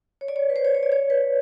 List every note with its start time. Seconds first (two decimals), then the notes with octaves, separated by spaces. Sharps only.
0.21 C#5
0.28 D5
0.36 C#5
0.50 B4
0.56 C5
0.65 C#5
0.75 C#5
0.83 D5
0.92 C#5
1.10 B4